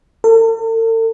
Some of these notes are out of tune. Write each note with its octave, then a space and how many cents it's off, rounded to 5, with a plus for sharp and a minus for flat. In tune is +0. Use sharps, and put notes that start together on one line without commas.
A4 +45